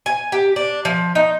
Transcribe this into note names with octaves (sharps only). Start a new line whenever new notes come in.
G#5
G4
D4
F3
D#4